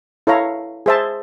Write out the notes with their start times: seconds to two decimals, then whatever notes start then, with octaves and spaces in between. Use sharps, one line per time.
0.27 E4 A4 C#5 F5 A#5
0.86 G#4 C5 E5 A5